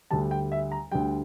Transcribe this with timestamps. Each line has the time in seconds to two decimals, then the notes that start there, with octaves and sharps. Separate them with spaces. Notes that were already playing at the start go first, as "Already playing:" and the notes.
0.11 D2 D3 G3 A5
0.31 G5
0.52 E5
0.72 A#5
0.92 D2 D3 G3 G5